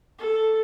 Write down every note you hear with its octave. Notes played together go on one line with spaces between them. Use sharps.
A4